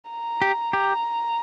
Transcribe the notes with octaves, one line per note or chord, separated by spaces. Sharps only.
A#5
G4
G4